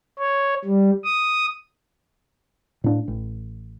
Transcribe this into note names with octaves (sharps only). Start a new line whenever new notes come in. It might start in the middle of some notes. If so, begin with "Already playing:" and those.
C#5
G3
D#6
A2 D4
A1